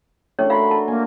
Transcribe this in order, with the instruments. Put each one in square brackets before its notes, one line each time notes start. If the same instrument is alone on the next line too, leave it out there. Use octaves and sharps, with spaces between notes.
[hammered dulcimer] A3 D4 [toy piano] C#4 C#5
[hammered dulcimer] F#4 A#4 C6 [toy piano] F5 [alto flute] B5
[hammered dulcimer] A4 [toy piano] A5
[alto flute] A#3 [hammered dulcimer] G#5